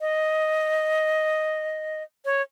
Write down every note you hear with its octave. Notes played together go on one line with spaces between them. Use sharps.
D#5
C#5